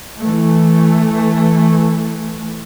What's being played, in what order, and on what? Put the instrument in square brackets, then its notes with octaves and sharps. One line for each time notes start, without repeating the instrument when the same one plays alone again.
[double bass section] E3 A3